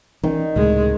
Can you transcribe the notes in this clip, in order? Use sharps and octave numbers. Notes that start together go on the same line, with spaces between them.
D#3 E3 C4 C#4
C#2 A2 C3 G#3